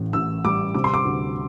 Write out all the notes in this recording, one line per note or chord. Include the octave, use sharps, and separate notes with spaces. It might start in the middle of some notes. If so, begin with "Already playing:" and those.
Already playing: A1 A2
A1 E6
G3 D6
C3 D6
C6
D6
D2